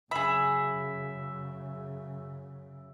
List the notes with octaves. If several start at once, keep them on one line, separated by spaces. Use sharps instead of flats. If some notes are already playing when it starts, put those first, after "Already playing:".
F#2 C#3 G#4 E5 B5